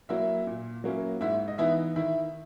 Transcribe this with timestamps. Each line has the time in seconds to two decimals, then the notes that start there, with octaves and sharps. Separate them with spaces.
0.09 F#3 A#3 E4 E5
0.47 A#2
0.84 F#3 A#3 C#4 E4
1.21 G#2 E4 E5
1.48 D#5
1.58 E3 B3 D#4 E4 E5
1.96 D#3 E4 E5